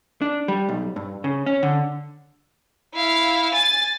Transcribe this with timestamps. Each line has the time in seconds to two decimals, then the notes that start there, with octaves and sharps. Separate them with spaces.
0.22 D4
0.48 G3
0.69 B1
0.96 G2
1.24 C#3
1.46 C#4
1.63 D3
2.94 E4 F5
3.54 G#5 A6